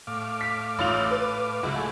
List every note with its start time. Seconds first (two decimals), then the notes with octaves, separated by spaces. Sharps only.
0.07 A2 F5 D6
0.41 B6
0.79 A1 F4 F7
1.11 B4
1.63 C#2 F#3 E4 F#4
1.76 A3 G#5